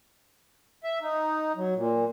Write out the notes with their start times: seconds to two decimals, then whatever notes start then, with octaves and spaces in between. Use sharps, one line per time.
0.84 E5
1.01 D#4
1.56 F#3
1.75 A#2